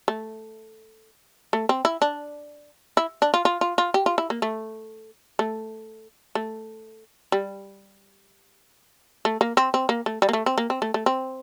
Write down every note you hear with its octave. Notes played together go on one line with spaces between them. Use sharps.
A3
A3
C4
E4
D4
E4
D4
F4
F4
F4
F4
G4
F4
E4
A#3
A3
A3
A3
G3
A3
A#3
C4
C4
A#3
A3
G3
A#3
A3
C4
A#3
C4
A3
A3
C4